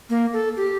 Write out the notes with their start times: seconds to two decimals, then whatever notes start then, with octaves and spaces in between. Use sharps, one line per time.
0.10 A#3
0.33 A4
0.57 G4